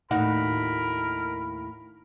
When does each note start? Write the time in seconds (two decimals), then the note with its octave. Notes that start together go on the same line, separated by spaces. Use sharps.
0.11 D#2 A2 D#4 F#4 A#4 B5